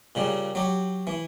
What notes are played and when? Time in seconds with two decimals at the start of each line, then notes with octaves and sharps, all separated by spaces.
0.15 A#2 C#3 G3
0.55 F#3 G4
1.07 E3